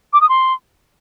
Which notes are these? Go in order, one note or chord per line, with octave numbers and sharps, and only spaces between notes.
D6
D#6
C6